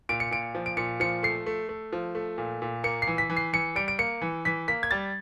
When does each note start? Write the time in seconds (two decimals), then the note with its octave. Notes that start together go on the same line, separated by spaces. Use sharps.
0.09 A#2 D7
0.20 C#7
0.31 A#2 D7
0.55 F3
0.66 D7
0.77 A#2 C#7
1.00 F3 C#7
1.23 A3 C7
1.46 A3
1.69 A3
1.93 F3
2.15 A3
2.38 A#2
2.62 A#2
2.84 A#3 C#7
3.02 C7
3.07 E3
3.18 B6
3.30 E3
3.37 C7
3.53 E3 C#7
3.76 G3 D7
3.88 D7
3.99 A#3 C#7
4.22 E3
4.45 E3 B6
4.68 A#3 B6
4.83 G#6
4.91 G3 A6